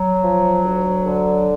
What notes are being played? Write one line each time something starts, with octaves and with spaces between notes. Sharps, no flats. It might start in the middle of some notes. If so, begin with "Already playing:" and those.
Already playing: F#3
F3
D2
D3